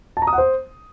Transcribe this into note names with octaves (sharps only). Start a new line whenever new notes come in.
A5
A#5
D#6
F#5
C5